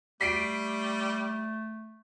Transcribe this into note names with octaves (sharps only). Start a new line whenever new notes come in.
G3 A3 B6 C7 D7